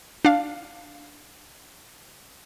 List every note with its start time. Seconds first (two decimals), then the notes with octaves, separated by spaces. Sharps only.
0.25 D4 F5